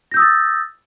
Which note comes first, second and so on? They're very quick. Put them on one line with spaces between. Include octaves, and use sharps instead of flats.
A#6 G6 E6 D#6 A6